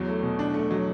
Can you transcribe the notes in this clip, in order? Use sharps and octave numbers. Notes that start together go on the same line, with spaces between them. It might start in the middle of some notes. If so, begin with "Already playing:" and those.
Already playing: E2 F#3
A3
B2
D4
A3
F#3